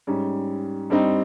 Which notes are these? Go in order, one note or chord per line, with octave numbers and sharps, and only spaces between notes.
G#2 G3 C#4
G2 G3 C4 D#4